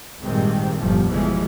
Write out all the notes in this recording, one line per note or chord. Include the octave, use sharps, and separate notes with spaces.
G#1 G2 A#2 D#3 G#3 C4
G1 E2 G2 A#2 F3
G1 B2 E3 F3 G#3